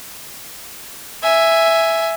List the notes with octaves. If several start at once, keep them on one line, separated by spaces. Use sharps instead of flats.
E5 G#5